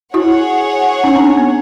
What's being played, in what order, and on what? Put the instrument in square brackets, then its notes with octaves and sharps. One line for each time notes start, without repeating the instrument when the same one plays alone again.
[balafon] E4 F#4 [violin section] G#4 C#5 F#5
[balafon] C#4 D#4
C4 D4
C4
B3